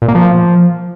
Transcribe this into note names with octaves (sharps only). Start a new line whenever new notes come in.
A#2
A#3
F3